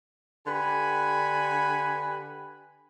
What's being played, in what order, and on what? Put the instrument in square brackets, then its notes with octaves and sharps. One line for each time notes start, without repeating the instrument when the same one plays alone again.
[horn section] D3 G4 B4 G#5 B5